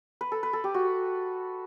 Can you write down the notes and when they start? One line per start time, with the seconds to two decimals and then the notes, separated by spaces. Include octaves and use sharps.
0.21 B4
0.32 A4
0.43 B4
0.53 A4
0.64 G4
0.74 F#4